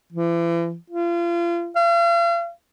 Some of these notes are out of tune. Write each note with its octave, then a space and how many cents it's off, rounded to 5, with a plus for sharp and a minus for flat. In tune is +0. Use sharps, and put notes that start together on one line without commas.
E3 +40
F4 -35
F5 -40